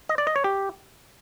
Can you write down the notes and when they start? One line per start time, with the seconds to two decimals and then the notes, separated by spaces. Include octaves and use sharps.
0.09 D#5
0.18 D5
0.27 D#5
0.36 C#5
0.44 G4